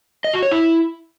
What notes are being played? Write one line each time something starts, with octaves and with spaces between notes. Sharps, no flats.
D#5
F#4
C#5
E4